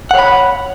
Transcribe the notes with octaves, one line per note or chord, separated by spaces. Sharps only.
C#5 F#5 B5